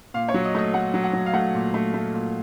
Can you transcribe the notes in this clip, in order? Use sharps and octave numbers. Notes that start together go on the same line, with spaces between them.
A#2 F5
C#5
F#3
D#5
A3 D#5
A3 F#5
F#3
F#5
F#3
F5
A3 F#5
A#2
A3
A3
A#2